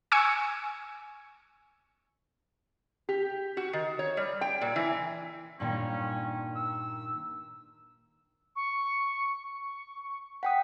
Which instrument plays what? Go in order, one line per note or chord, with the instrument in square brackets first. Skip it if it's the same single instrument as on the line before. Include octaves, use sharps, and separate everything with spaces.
[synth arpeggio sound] G#5 C#6 E6 C#7
[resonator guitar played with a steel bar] G4
F#4
D#3
C#5
G3
G5
A#2
E3
[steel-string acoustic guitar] G2 A#2 D#3 [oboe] C#4
[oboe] E6
[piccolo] C#6
C#6
[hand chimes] F#5 G5 D#6 [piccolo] B6